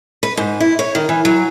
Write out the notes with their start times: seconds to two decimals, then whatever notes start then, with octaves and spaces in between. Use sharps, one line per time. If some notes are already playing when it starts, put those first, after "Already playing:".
0.23 B4
0.37 G#2
0.60 E4
0.79 C#5
0.95 D#3
1.09 E3
1.25 F#3